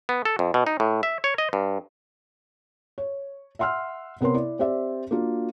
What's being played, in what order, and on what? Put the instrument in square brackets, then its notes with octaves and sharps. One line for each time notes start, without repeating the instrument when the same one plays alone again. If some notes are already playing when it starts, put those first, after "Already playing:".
[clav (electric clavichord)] B3
A4
F2
B2
D#4
A2
E5
C#5
D#5
G2
[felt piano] C#5
E5 F#5 C6 E6 F6
C3 B3 A#4 C#5 C6
E4 D5
C4 G4 C5 D5 E5
A#3 D4 F4 F#4